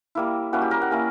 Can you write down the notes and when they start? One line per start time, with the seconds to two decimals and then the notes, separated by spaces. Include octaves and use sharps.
0.15 G3 A#3 E4
0.53 G3 A#3 C#4 E4 F#4
0.62 G4
0.71 A#4
0.82 F#5
0.90 G3 A#3 C#4 E4